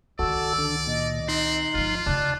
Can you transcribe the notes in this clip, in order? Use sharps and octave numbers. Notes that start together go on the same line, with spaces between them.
C#2 D#3 F#4 A4 D5 E6
D3
A#2 D#5
C4 D#4 C6 F#6
G1 F3 F4
C#3 B3 D5 A5 F#6